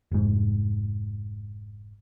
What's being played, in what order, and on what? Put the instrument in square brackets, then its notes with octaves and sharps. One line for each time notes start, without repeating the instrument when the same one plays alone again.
[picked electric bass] F1 G#2